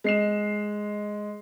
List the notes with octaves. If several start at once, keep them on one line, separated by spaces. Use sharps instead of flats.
G#3 C7 E7